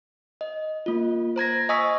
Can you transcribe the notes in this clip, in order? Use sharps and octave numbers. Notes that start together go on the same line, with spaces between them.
D#5
A#3 F4
C5 A#5 G#6 A#6
D#5 G#5 C#6 D#6 E6 B6